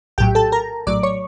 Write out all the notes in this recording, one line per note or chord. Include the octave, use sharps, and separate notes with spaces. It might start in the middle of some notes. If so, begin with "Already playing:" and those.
A#1 A2 F#3 G4 G5
A4 A5
A#4 A#5
A#1 A2 F#3 D5 D6
C#5 C#6